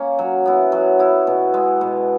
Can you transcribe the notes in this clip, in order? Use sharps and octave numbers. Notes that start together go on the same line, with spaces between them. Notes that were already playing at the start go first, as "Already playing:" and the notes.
Already playing: A#3 C#4
F#3
B3 E4
F#3
B3 E4
B2
G#3 B3
B2